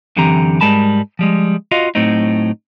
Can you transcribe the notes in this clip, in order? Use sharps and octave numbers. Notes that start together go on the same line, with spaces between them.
F#2 D3 E3 C4 G4 A#5
G#2 G3 G#3 A#4 A5 B5
F3 G3 G#3
F4 F#4 D#5 F5
A2 F#3 A3 C4 D#4